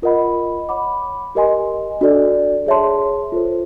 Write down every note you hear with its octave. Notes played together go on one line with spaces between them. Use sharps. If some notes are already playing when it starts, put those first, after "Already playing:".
F4 A#4 D#5 F#5 B5
C#5 F#5 B5 D6
G4 A#4 D#5 G#5 C6
D4 F#4 A4 D5
G#4 C#5 E5 A5 C6
F4 A4 C5